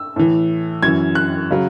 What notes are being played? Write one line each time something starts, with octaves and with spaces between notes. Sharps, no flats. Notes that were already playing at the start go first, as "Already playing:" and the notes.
Already playing: E6
A2 E3
F#2 E3 G#6
F#6
C#3 F#3